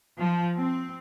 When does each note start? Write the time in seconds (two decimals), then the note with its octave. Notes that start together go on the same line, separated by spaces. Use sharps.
0.18 F3
0.55 C4